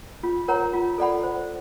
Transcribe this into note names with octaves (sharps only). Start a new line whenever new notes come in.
F4
A#4 C#5 F#5 A#5
F4
A4 D5 F#5 B5
C5